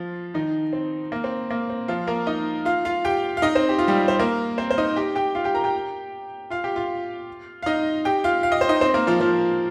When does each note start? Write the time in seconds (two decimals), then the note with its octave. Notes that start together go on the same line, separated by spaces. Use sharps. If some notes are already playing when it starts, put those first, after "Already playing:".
Already playing: F3 F4
0.34 D#3 D#4
0.73 C4
1.12 A#3
1.24 C4
1.51 A#3
1.70 C4
1.88 F3 F4
2.07 A#3 A#4
2.27 D#4 D#5
2.65 F4 F5
2.85 F4 F5
3.05 G4 G5
3.37 F5
3.42 D#4 D#5
3.55 C4 C5
3.69 G4
3.79 F4
3.88 G3 G4
4.08 C5
4.19 A#3 A#4
4.58 C4 C5
4.71 C5
4.78 D#4 D#5
4.96 G4 G5
5.15 G4 G5
5.35 F4 F5
5.44 G4 G5
5.54 A#4 A#5
5.64 G4 G5
6.50 F4 F5
6.64 G4 G5
6.76 F4 F5
7.62 F5
7.66 D#4 D#5
8.05 G4 G5
8.24 F4 F5
8.43 F5
8.52 D#5
8.61 C5
8.69 D#4 D#5
8.81 C4 C5
8.94 A#3 A#4
9.07 F3 F4
9.20 F3 F4